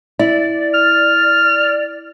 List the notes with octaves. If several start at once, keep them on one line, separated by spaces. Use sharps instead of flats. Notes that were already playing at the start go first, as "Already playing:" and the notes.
E4 D5
F6